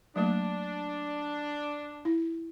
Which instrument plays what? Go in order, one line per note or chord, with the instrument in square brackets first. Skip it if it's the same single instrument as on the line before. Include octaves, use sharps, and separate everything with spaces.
[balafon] F#3 A3 A#3 [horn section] D4
[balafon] E4